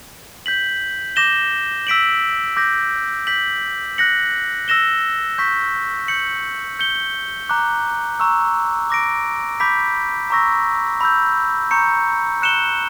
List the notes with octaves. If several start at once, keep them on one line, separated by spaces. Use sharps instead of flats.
G6 B6 F#7
D6 G6 A#6 E7 G7
E6 B6 D7 F#7
D6 G6 A#6
G6 B6 F#7
F#6 A#6 C#7 F#7
E6 A#6 E7 G7
C#6 G6 B6
G6 C#7 F#7
G6 C#7 G7
A#5 D6 F#6
A#5 C#6 E6
D6 A#6 D7
B5 D6 G6 B6
A#5 C#6 E6 A#6
B5 E6 G6
A#5 C#6 G6 C#7
F#6 C#7 E7 G7